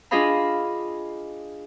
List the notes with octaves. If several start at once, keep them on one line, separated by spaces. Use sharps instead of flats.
D4 F4 G#4 D#5 F5 B5